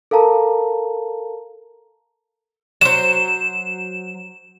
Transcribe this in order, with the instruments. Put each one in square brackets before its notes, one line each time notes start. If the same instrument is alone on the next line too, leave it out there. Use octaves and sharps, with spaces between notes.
[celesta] A4 A#4 F5 A5 A#5
[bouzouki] F#3 C5 [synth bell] E7